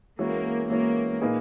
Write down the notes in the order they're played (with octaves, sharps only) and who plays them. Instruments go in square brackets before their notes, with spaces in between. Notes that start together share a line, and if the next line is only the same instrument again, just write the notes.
[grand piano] E3 G#3 C#4 F#4 [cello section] A#3
[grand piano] E3 G#3 C#4 F#4 [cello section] A#3
[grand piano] A#2 A#3 D#4 G#4 B4